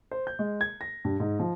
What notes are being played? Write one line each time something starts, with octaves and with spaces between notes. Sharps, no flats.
C5
G6
G#3
G#6
A#6
G2
G#2
F3